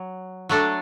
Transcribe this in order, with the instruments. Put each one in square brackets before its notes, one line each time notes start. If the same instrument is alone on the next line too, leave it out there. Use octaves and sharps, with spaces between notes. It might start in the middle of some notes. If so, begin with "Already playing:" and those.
Already playing: [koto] F#3
F#3 A3 D4 A4